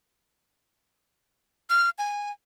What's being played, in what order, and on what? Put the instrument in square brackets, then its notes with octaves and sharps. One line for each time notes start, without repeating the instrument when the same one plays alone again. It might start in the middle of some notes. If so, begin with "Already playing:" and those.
[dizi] F6
G#5